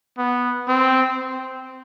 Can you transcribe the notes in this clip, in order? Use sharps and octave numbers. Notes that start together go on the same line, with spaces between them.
B3
C4